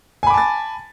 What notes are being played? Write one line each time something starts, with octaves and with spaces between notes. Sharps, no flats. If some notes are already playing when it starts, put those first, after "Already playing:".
G#5 A5 B5 D6 A6